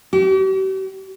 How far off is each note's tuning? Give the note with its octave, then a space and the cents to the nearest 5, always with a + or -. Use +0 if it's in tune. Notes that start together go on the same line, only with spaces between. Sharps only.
G4 -45